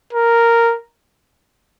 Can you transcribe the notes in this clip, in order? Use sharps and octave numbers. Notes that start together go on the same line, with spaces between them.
A#4